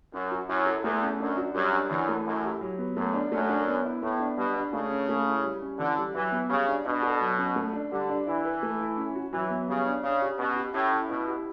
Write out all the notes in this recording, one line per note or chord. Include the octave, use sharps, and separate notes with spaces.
F#2 C#4
F#4
F#2 E4
A4
E2 A3
C#4
F#2 D4
F#4
F#2 G3
D4
F#2 E3
A3
F#2 E4
G4
F#3
B3
F#2 A3
D4
F#2 A3
D4
B3
E4
A2 B3
D4
B2 G3
D4
C#3 A3
C#4
A3
E4
G3
C#4
D3 E3
G3
E3 F#3
B3
C#3 G3
D4
B2 D4
A4
F#3
C#4
A3
D4
D3 G3
D4
E3 E4
B4
A3
E4
C#4
F#4
E3 F#3
B3
C#3 G3
D4
C#3 D4
G4
B2 C#4
G4
A2 C#4
E4
B2 E4
G4